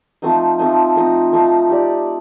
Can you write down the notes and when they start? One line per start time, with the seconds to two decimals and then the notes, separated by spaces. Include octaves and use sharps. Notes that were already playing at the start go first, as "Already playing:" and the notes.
0.22 F3 A3 C4 D#4
0.59 F3 A3 C4 D#4
0.96 F3 A3 C4 D#4
1.32 F3 A3 C4 D#4
1.69 D#4 G4 D5